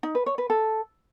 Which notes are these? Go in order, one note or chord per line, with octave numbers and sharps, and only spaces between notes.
D#4
B4
C#5
B4
A4